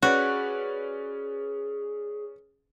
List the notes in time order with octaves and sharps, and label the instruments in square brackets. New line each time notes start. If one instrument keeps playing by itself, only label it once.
[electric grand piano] C#4 B4 D5 [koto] F#4 [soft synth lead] G#4